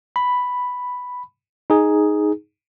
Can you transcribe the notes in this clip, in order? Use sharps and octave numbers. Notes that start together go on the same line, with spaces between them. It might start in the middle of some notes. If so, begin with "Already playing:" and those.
B5
D#4 G#4